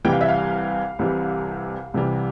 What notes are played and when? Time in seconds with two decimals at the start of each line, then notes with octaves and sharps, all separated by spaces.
0.05 C2 C3 E3 G3 G5
0.13 F5
0.21 E5
0.29 F5
0.99 C2 C3 E3 G3
1.94 C2 C3 E3 G3